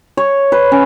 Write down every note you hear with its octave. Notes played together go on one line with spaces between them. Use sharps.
C#5
B4
C#4